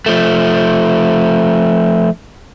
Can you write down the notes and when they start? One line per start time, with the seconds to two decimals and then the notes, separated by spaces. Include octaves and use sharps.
0.06 F3 A3